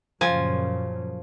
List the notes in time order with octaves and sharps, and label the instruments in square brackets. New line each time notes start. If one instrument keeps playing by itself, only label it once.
[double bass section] F#2 A#2 C#3 [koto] F3 G#5